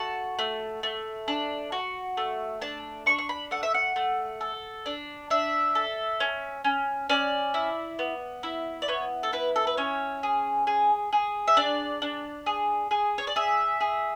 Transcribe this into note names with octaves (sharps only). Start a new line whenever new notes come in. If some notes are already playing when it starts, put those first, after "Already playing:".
Already playing: A3 F#4 A5
A3
A3
D4
F#4
A3
D4 A5
D4 C#6
C#6
B5
A3 F#5
E5
F#5
A3
A4
D4
D4 E5
A4
C#4
C#4
C#4 D5
E4
B3
E4
D5
B3 C#5
A4
E4 B4
A4
B4
C#4 C#5
G#4
G#4
G#4
E5
D4 D5
D4
G#4
G#4
C#5
D5
G#4 E5
G#4